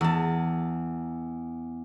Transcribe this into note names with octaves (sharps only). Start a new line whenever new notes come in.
E2 A5